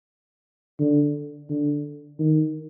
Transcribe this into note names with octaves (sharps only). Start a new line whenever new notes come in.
D3
D3
D#3